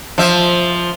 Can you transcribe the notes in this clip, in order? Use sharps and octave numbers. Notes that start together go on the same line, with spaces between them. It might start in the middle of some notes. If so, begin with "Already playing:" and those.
F3 E5